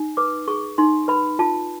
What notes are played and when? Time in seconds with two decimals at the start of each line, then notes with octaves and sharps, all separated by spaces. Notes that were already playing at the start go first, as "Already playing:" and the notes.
Already playing: D#4
0.17 B4 D6
0.48 G#4 C#6
0.78 D#4 C6
1.08 B4 B5
1.39 F4 A5